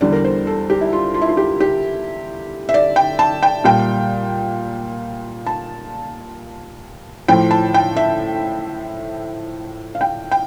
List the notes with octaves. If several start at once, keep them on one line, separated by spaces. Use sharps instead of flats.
E2 D3 G3 D5
A#4
C5
A4
G4
E4
F4
F4
E4
F4
G4
G4
E5
D5
G5
A5
G5
A#2 G3 G5
A5
A2 F3 G5
A5
G5
E5
F5
G5
G5